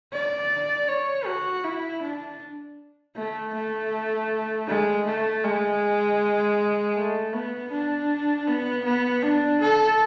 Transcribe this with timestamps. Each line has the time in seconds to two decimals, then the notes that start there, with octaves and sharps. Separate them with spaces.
0.13 D5
0.89 C#5
1.26 F#4
1.64 E4
2.02 D4
3.16 A3
3.54 A3
4.68 G#3
5.05 A3
5.44 G#3
6.96 A3
7.33 B3
7.71 D4
8.47 B3
8.85 B3
9.23 D4
9.61 A4